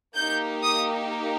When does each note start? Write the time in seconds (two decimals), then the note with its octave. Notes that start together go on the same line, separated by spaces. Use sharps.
0.16 A#3 D#4 G4 G6
0.63 D#6